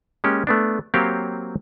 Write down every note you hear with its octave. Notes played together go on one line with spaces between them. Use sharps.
G#3 A#3 C#4 G4
A3 B3 D4
F#3 A#3 C4 G4 C#5 F5